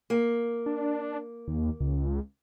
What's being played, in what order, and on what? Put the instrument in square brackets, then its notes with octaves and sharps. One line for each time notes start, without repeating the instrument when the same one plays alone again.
[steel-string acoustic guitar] A#3
[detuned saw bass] D4
D#2
C#2